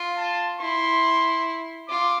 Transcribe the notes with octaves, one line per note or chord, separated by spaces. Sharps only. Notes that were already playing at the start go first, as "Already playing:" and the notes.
Already playing: F4
A5
E4 C6
F4 D6